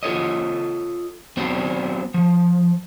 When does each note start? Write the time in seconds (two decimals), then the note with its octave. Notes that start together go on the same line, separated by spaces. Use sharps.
0.03 F4 A4 C#5 D#5
1.37 F#3 B3 C4 D4 C5 D5
2.14 F3